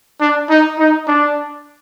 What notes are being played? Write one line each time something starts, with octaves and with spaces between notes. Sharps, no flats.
D4
D#4
D#4
D4